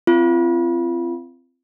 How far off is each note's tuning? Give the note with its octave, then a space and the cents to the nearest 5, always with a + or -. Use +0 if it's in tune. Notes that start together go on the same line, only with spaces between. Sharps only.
C4 -10 F4 -35